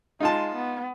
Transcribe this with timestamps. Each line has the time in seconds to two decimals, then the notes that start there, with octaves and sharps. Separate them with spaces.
0.20 G#3 D#4 F4 A5
0.55 B3